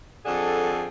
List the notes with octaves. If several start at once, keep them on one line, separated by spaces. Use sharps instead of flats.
F2 D3 G#4 A4